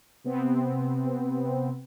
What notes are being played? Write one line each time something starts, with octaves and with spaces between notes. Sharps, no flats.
C3 B3 C4